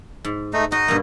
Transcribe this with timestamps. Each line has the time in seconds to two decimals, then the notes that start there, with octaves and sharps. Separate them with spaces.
0.25 G#2
0.53 A3 D#4
0.72 D#4 F#4 D#5
0.88 G2 B2 A#3